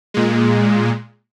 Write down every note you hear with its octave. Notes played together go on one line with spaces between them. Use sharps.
A#2 G#3